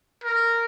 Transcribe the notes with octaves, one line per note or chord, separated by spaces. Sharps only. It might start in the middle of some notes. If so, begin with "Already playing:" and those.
A#4